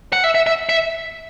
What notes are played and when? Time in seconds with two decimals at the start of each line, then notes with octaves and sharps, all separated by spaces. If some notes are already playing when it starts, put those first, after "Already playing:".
0.13 F#5
0.24 E5
0.35 E5
0.47 E5
0.69 E5